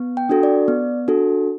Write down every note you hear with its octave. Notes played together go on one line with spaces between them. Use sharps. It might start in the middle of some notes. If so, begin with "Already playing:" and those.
Already playing: B3
G5
D4 F#4 A4
D5
B3
D4 F#4 A4